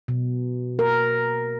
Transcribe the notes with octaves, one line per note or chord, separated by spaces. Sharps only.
B2
A#4